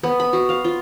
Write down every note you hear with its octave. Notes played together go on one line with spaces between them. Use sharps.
B3
B5
F#4
F5
F4